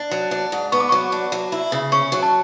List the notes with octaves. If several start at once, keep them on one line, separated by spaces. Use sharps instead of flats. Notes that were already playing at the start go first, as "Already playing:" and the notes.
Already playing: D4
F#3
D4
G#2
B3 C#6
D6
F#3 C#6
D4
F#3
E4
C#3
C#4 C#6
F#3
A5